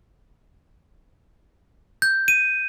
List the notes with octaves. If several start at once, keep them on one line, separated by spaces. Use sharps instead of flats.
G6
D#7